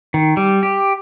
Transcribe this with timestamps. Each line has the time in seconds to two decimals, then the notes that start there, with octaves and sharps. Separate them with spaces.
0.14 D#3
0.37 G3
0.63 G4